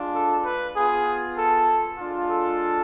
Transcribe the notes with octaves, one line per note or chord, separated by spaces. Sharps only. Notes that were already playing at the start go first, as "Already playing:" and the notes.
Already playing: G#3 D4 F4
A4
B4
B3 F4 G#4
A4
G#3 D4 F4
A4